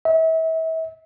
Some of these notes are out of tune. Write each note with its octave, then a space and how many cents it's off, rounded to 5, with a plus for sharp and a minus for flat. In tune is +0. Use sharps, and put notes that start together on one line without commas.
E5 -35